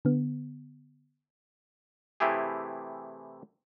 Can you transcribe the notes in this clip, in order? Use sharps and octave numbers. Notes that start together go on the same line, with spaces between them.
D3 B3
C3 E3 A3 E4 G4 G#4